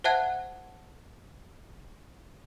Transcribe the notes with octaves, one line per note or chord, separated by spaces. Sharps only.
C5 E5 F#5 A5 F#6 G#6